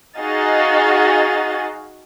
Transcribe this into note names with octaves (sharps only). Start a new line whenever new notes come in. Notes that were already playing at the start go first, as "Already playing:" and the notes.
D#4 F#4 G#4 D#5 F5 A6